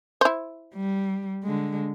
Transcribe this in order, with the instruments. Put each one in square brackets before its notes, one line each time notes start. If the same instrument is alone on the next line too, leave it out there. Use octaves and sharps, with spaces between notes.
[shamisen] E4 C5
[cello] G3
D3 G#3